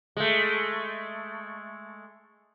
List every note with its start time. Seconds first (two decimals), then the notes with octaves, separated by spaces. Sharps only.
0.17 G#3 A3